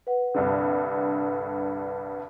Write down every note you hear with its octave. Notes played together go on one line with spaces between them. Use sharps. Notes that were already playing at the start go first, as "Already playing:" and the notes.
B4 F#5
C2 G2 D3